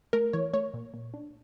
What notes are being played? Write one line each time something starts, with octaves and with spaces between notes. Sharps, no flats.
A3 A#4
E3 C#5
A3 C#5
A#2
A#2
D4